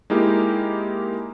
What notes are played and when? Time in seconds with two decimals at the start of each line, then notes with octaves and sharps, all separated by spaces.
0.10 G#3 A#3 D#4 E4 G4 A#4